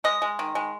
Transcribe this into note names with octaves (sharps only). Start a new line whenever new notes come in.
G#3 D#5
G#3
D#3
G#3